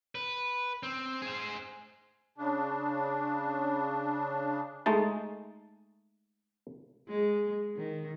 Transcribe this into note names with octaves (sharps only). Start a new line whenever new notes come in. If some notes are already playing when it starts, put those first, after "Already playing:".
B4
C4
G#4 C5
C#3 D4
G#3 A3 D#4 A5
G#3
D#3